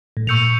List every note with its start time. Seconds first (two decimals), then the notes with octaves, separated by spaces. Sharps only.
0.17 A2
0.27 A#2 C#6 E6 G6 C#7 F7